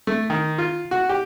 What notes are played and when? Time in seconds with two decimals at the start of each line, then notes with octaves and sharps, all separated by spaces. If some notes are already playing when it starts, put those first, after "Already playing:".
0.07 A3
0.30 D#3
0.58 F4
0.91 F#4
1.09 G4